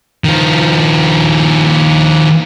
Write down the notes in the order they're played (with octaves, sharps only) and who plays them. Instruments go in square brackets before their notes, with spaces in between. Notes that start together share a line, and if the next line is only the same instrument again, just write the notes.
[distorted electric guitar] D#3 F3